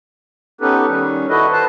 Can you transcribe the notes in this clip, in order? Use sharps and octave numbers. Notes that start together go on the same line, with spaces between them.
B3 C#4 D#4 G4 A4 B4
D#3 G3 C#4
E4 F#4 A4 B4 D#5
B4 C5 A5